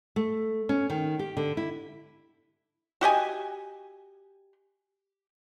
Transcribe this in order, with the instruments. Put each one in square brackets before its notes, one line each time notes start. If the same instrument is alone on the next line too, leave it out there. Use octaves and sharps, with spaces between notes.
[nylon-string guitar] A3
C#4
D#3
G4
D3
E4
[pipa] F#4 G4 D#5 G#5